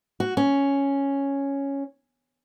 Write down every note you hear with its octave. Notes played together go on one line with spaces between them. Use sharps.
F#4
C#4